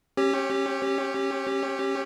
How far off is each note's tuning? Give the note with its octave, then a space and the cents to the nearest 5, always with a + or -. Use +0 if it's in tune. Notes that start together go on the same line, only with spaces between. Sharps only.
C#4 -35 G4 +0 C#5 +0